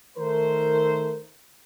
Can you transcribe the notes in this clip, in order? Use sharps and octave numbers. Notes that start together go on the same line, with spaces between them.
D#3 A3 A#4 C5